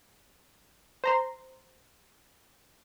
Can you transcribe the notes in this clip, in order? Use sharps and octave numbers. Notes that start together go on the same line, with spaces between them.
C5 A#5 C6